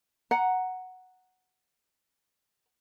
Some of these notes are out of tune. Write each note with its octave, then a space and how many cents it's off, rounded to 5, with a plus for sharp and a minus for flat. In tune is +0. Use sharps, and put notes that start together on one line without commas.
F#5 +0 A#5 +0